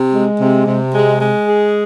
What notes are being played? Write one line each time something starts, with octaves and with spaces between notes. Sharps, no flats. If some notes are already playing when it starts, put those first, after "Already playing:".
Already playing: C3
G#3
C3
C3
G#3
G#3
G#4